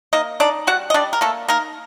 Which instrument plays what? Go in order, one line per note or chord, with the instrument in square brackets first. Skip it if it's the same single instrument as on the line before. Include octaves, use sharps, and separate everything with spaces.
[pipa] A#3 D#4 D#5
D4 D#4 D5
G3 F#4 F#5
D#5
G3 D4 D5
A#4
A3 A#3 A4
A#3 D#4 A#4